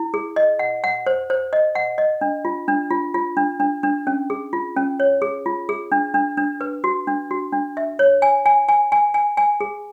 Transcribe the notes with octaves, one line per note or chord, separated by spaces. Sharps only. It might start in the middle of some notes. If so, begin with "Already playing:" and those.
Already playing: E4
G#4
D#5
F#5
F#5
C5
C5
D#5
F#5
D#5
D4
F4
D4
F4
F4
D4
D4
D4
C#4
G#4
F4
C#4
C#5
G#4
F4
G#4
D4
D4
D4
B4
F#4
D4
F#4
D4
E5
C#5
G#5
G#5
G#5
G#5
G#5
G#5
G#4